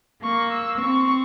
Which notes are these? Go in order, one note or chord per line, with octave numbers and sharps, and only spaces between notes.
A#3 C#6
E6
C4 C#6